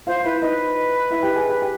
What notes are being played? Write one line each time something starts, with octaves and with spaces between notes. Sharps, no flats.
F4 C5 F5
E4 B4 E5
D#4 B4 D#5
E4 E5
G4 G5
G#4 G#5
G4 G5
G4 G5